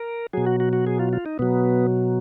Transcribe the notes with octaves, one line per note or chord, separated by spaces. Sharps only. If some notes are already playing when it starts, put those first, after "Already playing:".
Already playing: A#4
B2 F#3 G#4
F#4
F#4
F#4
G#4
F4
F4
D#4
B2 F#3 B3